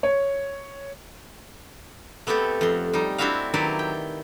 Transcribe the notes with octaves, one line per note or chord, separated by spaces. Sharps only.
C#5
A3 B3 C4 G4 A4
F2 C6
G3 D#4
C4 D4 E4 F#4 E5 F5
D#3 F#3 E4 G4 B4 D5
G5